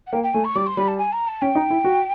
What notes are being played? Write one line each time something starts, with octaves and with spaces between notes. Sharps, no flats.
F#5
A#3 G5
G5
A3 G#5
C#6
G3 D6
C6
G3 B5
A5
G#5
A#5
A5
C#4 G5
D#4
E4
F#4